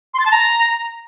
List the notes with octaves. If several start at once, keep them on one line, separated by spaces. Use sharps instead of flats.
C6
A6
A5
A#5